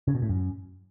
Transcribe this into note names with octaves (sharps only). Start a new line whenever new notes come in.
C#3
B2
A2
F#2